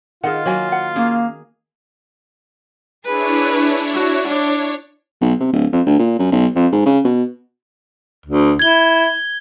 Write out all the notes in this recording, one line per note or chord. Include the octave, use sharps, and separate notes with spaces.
D#3 F4 G#4 D#5 F#5
F#3 A#3 F#4 G#5
F#5
A#3 C#4 G#4
D4 E4 G#4 B4 C#5
F#4
D4 C#5
B1
C3
D1
F2
D2
A#2
F#2
B1
F2
G#2
C#3
B2
D2
E4 G#6 G7